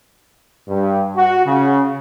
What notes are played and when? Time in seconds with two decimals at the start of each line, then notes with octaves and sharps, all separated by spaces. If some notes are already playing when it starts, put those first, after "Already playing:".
0.68 G2
1.16 F#4
1.46 C#3